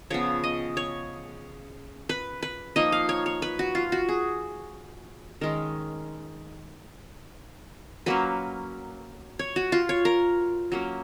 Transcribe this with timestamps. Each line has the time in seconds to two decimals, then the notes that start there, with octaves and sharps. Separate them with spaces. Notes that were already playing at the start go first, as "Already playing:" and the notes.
0.10 C#3 F3 B3 C#5
0.44 D#5
0.77 C#5
2.09 B4
2.43 B4
2.76 F3 A#3 D#4 D#5
2.92 F5
3.09 C#5
3.26 C#5
3.42 B4
3.59 F#4
3.75 F4
3.92 F#4
4.09 G#4
5.41 D#3 G#3 C#4 A#4
8.06 F#3 A#3 C#4 B4
9.39 C#5
9.56 F#4
9.72 F4
9.89 C#5
10.05 A#4
10.72 F#3 A#3 C#4